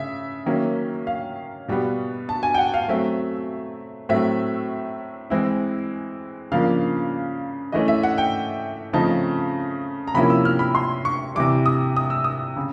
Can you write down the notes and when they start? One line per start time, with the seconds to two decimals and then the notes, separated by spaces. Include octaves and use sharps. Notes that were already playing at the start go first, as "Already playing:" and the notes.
Already playing: C#3 E5
0.46 D#3 F#3 A#3 C#4
1.07 F5
1.68 B2 G3 B3
2.29 A5
2.43 G#5
2.54 G5
2.58 F#5
2.74 F5
2.88 F#3 A3 C4 E5
4.09 A2 F#3 A3 C4 E5
5.30 E3 G#3 C4 E4
6.52 C#3 F3 A#3 D4 F5
7.72 E3 A3 C#4 D#5
7.88 E5
8.03 F#5
8.18 G5
8.93 C#3 F3 A3 C4 D#4 A5
10.08 A#5
10.14 C3 F3 A#3 C#4 E4 B5
10.30 E6
10.45 F6
10.59 B5
10.75 C6
11.05 C#6
11.35 C3 E3 G3 D6
11.66 D#6
11.96 D#6
12.10 E6
12.24 D#6
12.56 C#3